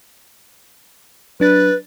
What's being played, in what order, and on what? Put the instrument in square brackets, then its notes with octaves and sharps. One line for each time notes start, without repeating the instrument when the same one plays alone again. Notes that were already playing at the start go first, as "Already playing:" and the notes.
[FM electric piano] F#3 D4 A6 [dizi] B4